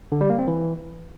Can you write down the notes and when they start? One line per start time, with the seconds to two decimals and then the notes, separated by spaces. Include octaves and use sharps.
0.12 D3
0.21 G3
0.30 A#3
0.39 C4
0.48 E3